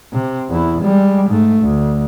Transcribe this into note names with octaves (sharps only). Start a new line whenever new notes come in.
C3
E2 E4
G3 G#3
G#2 A3
D2